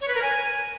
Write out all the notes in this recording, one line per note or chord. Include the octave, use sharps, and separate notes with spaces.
C#5
B4
A#4
G#5